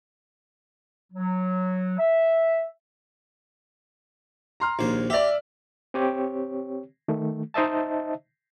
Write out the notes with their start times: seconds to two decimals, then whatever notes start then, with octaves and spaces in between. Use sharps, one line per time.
1.13 F#3
1.99 E5
4.60 A#5 C6 F6
4.79 A#1 D#2 C5
5.10 G4 D5 E5 A#5
5.94 C4 G4 C#5
7.08 D#3 A3
7.54 D#4 C5 D#5 E5 A5